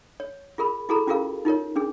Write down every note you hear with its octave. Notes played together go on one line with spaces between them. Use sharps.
C#5
F4 G#4 A#4 B5
E4 F#4 G#4 A4 A#5 B5
C#4 F4 F#4 G#4 A#4 F5
D#4 F4 A#4 C#5
C#4 D4 G#4